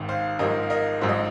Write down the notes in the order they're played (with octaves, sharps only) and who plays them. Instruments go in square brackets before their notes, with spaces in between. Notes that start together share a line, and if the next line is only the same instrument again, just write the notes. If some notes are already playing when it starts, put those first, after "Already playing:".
Already playing: [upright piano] G#1 G#2 D#3
C5 F5
G#1 G#2 F3 A#4 D#5
F5
A#4 D#5
G#1 G#2 F3 C5
D#5